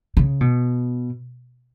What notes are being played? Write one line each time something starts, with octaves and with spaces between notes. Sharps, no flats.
C#3
B2